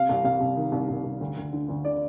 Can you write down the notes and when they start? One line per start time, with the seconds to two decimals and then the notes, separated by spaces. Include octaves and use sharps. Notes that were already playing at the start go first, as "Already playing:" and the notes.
Already playing: C3 F5
0.09 C2
0.25 C2 F5
0.41 C2
0.57 D#3
0.72 C2
0.89 C2
1.04 C2
1.21 D2
1.37 D2
1.53 D3
1.69 D2
1.85 D3 D5